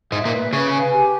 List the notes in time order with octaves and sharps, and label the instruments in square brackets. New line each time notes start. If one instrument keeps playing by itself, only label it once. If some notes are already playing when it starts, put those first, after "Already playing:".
[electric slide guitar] G#2 G#3 [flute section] E5
[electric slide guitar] A#2 A#3
[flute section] B4
[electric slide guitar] C#3 C#4 [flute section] B4
[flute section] G#5
G4